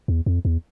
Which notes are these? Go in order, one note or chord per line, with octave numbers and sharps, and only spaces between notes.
E2
F2
E2